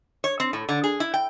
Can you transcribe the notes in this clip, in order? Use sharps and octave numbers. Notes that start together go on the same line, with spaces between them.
C#5
C4
A2
D3
G#4
E4
G5